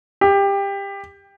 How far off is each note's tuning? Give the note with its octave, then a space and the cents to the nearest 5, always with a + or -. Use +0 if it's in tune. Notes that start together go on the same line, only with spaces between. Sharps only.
G4 +20